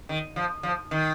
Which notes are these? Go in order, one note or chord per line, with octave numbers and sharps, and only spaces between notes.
D#3
F3
F3
D#3